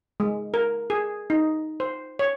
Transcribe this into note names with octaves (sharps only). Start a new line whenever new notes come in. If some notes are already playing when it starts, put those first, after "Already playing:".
G#3
A#4
G#4
D#4
C5
C#5